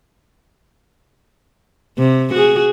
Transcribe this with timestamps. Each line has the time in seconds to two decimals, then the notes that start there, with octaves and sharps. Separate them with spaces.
1.99 C3
2.34 F#4 G#4